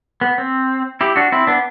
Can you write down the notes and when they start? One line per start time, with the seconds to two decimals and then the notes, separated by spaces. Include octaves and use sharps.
0.21 B3
0.38 C4
1.01 E4 G4
1.16 D4 F#4
1.32 C4 E4
1.47 B3 D4